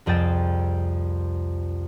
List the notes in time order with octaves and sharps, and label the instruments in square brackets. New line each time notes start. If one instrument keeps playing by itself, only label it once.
[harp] C2 F2 G#4 G5 A6 E7